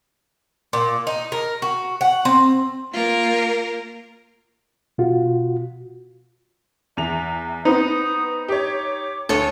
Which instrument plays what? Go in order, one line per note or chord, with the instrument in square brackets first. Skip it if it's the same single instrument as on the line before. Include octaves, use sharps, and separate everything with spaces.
[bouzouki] A#2
D#4
A#4
F#4
F#5
C4
[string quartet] A#3 F4 A#4
[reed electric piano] B2 F4 F#4
[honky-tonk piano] E2 F7 [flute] E5
[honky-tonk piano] B3 C4 B4 [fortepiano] D#4 [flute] D#6
[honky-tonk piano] G4 C#5 [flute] D6
[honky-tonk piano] D2 D#7 [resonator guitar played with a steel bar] A4 C#5 [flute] A5